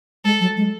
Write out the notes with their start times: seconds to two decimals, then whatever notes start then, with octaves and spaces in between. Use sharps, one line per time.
0.24 G#3 A4
0.40 F#3
0.57 G#3